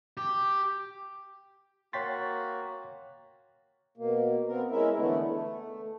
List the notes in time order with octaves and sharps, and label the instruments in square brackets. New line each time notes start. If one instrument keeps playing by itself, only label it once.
[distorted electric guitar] G4
[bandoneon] A#3 F#4 [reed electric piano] C#5 G5 C6 [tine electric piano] A6 B6
[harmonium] B2 A#3
B3 C4 A#4
G#3 C#4 E4 A#4 E5
D3 E3 A3 B3 E4
A3